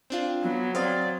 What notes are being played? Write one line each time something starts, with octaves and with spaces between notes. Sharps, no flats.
C4 D4 F4
F#3 B3
C4 D5 F5 D#6